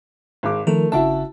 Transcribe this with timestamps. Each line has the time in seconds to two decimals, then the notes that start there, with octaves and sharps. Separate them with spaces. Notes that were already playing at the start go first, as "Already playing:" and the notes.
0.43 G#1 G#3 D6
0.67 D#3 F3 A3 A#4
0.92 G1 C#3 E4 F#4 E5 A5